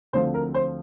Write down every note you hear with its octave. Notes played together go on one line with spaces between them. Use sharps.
D2 D3 F3 C4 C5
A#4
C5